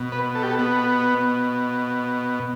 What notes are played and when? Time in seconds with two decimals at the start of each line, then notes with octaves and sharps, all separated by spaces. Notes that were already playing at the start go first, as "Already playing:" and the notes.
Already playing: B2
0.12 B4
0.35 A4
0.43 G4
0.50 A4
0.59 B3